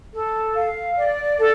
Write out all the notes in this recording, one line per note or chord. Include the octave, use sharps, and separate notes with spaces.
A4
F5
D5
A4